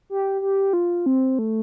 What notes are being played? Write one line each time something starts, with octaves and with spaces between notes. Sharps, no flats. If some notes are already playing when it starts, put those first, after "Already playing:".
G4
G4
F4
C4
A3